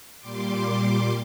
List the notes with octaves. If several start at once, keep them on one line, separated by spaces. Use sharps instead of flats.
A#2 G3 C6 D6